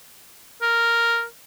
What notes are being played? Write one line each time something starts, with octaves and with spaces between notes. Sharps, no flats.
A#4